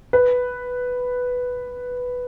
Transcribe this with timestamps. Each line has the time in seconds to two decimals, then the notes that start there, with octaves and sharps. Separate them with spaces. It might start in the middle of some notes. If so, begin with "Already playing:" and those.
0.13 B4